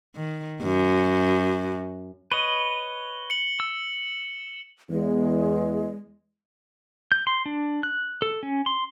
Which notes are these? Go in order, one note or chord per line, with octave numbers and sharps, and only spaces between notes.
D#3
F#2
B4 C#5 D#5 G7
C#7 F#7
E6
E2 G#3
G6
C6
D4
F#6
A4
C#4
C6